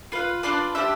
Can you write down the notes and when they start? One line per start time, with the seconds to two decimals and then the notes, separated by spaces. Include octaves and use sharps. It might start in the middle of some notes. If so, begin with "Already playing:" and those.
0.12 F4 B4 F5
0.43 D4 F4 B4 D5
0.75 D4 G4 C5 E5